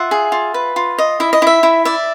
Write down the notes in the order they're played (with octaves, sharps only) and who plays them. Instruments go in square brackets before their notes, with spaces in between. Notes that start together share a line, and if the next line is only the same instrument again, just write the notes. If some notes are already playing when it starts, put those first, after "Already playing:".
Already playing: [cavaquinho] F4 E5 F#5
G#4
F4
B4
F4
D#5
E4 E5
D#5
E4 E5
E4
D5 E5